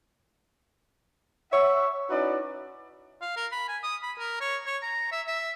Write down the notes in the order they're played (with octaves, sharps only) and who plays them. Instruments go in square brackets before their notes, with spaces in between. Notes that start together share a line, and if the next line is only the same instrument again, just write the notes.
[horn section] C#5 E5 F#5
C#4 D#4 E4 F#4 B4 D5
[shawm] F5
A#4
B5
G#5
D#6
B5
A#4
C#5
C#5
A#5
E5
E5